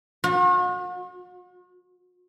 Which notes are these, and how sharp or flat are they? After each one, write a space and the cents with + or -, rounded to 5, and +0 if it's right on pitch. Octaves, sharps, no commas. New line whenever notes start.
F#4 -45